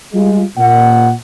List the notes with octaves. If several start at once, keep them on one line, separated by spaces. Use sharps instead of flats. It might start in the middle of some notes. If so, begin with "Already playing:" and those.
G3 G#3 F4
A#2 F#5